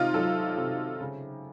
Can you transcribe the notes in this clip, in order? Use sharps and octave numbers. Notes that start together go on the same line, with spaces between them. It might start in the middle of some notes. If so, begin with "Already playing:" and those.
Already playing: C3 D#3 D#4 F4
F#3 A4
C3
C#3